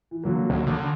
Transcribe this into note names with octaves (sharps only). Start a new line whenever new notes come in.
E3
D3 F#3 A#3
D2
D3